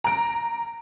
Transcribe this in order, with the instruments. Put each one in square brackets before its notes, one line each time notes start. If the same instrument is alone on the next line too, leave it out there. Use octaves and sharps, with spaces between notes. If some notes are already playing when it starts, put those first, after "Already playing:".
[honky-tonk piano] A#5 D7